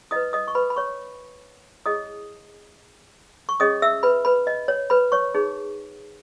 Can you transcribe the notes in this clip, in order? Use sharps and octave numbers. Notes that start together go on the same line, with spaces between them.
E4 B4 D#5 D#6
D#5 D#6
C#6
B4 B5
B5
C#5 C#6
E4 G#4 C#5 D#5 D#6
C#6
C#4 G#4 C#5 D#5 D#6
E5 E6
B4 B5
B4 B5
D#5
C#5
B4 B5
C#5 C#6
D#4 G#4 C#5